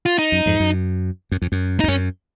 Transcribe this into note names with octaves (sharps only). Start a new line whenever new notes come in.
F4
D#4
F#2
F2 G#2
F#2
F#2
F2
F#2
D#4
F2
F#2 C#4